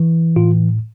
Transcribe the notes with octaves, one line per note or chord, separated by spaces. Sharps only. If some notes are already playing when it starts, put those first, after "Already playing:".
Already playing: E3
A2 F4